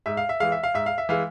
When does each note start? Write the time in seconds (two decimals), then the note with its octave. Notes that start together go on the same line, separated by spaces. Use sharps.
0.06 G#2 E5
0.17 F5
0.29 E5
0.40 E3 G#3 F5
0.52 E5
0.63 F5
0.74 G#2 E5
0.86 F5
0.98 E5
1.09 E3 G#3 F5